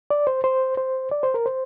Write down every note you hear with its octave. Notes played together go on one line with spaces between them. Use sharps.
D5
C5
C5
C5
D5
C5
A#4
C5